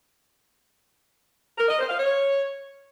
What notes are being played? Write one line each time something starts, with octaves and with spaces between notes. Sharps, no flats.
A#4
D#5
C5
F5
C#5